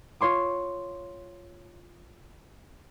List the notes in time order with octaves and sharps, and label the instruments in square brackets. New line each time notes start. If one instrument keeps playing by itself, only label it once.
[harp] F4 C#5 C6 D6